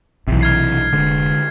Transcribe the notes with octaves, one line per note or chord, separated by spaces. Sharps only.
B1 C3 E3
F6 G#6 C7
F1 D3 G#3